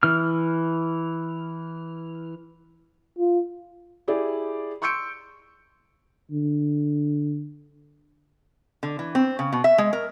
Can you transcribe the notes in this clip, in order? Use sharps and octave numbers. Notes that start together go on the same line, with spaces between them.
E3 F6
F4
E4 G4 G#4 D5
C6 C#6 E6 G6 C#7 D7
D3
D3
E3
C4
C#3
B2
E5
G#3
A#4